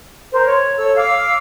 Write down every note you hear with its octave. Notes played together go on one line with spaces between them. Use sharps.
A#4 C5
C#5
A4 C#5 E6
F5 D6 E6